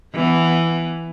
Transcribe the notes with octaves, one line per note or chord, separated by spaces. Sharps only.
E3 B3